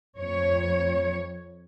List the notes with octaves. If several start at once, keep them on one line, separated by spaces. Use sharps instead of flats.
F2 C#5